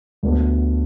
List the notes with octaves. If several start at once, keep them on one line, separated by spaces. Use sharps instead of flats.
D2 D3 B3